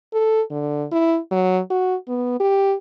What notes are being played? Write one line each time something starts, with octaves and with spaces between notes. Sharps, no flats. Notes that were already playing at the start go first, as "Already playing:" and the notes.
A4
D3
E4
F#3
F#4
B3
G4